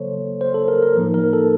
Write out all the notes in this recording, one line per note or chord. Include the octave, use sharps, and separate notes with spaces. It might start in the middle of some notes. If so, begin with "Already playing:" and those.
Already playing: C#3 F#3 A#3 A4 C5 C#5
C5
A4
A#4
A#4
A2 F3 A#3 D#4
A#4
A4